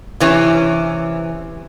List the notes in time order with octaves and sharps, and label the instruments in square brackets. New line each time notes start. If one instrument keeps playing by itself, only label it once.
[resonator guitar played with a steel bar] C3 E3 C#4